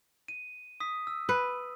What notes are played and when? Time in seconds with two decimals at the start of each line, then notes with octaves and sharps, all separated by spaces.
0.28 D#7
0.80 D#6 B6
1.07 E6
1.29 B4